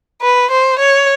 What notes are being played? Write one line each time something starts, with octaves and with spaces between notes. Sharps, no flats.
B4
C5
C#5